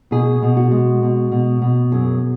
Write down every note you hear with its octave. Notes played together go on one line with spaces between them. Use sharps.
B2 G#4
B2
F#4
G#3
B2
B2
B2
F#2 G#4